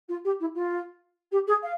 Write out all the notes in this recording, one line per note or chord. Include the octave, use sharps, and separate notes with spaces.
F4
G4
E4
F4
G4
G#4
F5